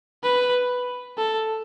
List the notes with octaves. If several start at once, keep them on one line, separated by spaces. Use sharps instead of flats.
B4
A4